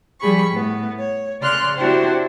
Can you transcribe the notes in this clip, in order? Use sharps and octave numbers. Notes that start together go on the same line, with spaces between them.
F3 G3 G#4 B5 C#6
A2 B3
C#5
C#3 D5 C6 F6 F#6
C4 D4 E4 F#4 G4 C5